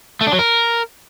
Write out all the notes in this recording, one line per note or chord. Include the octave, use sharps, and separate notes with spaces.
A3
D4
F#3
A#4